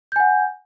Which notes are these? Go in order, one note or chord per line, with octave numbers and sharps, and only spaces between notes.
F#5 G#5 G6